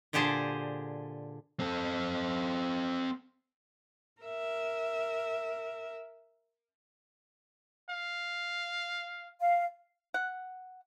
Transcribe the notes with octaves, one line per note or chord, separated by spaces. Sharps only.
A#2 D3 G4 G#4 C5 A5
C4 A4
A#4 E5
F5
F5
F#5